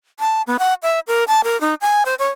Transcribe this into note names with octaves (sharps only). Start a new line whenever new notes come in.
A5
B3
F#5
E5
A#4
A5
A#4
D#4
G#5
C5
C#5